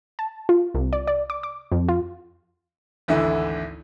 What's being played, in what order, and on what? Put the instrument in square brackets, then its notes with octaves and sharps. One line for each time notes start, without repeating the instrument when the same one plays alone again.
[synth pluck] A5
F4
C2
D5
D5
D6
D6
F2
F4
[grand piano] G#1 D2 D3 E3 E4 E5